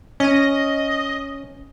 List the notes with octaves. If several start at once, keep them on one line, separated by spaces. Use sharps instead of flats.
C#4 D#5